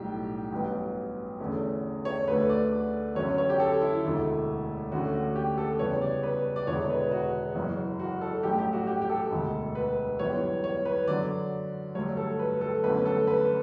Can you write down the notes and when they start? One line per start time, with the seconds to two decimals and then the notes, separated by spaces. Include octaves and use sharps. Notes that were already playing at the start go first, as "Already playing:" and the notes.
Already playing: B1 A2 G3 G4
0.52 A1 G2 F#3 B3
1.40 E2 D3 A3 C#4
2.05 C#5
2.28 D2 D3 A3 B4
2.49 D5
3.15 F#2 D3 F#3 C#4 C#5
3.38 C#5
3.50 G4
3.60 A4
3.81 E4
4.04 E1 D2 D3 A3
4.91 D2 D3 A3 C#4 F#4
5.14 F#4
5.36 G4
5.58 A4
5.79 E2 C#3 G3 B3 C#5
6.01 D5
6.23 B4
6.56 D5
6.67 E1 E2 D3 C#5
6.90 B4
7.11 F#4
7.55 F#1 F#2 E3
8.00 F#4
8.21 A4
8.43 A1 G2 F#3 A3 G4
8.58 G4
8.73 F#4
8.87 G4
9.02 G4
9.09 A4
9.31 E1 D2 D3
9.75 B4
10.19 G1 F#2 E3 G3 B3 C#5
10.64 C#5
10.85 B4
11.08 F#2 D3 F#3 D5
11.95 G2 D3 F#3 A3 C#5
12.17 A4
12.39 B4
12.61 A4
12.83 G1 F#2 D3 A3 C#4 B4
13.05 A4
13.27 B4